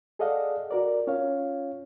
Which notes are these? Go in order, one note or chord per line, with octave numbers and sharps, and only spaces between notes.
G#4 A4 D5 D#5 F5 F#5
F#4 A#4 D5
C#4 F4 C#5 F5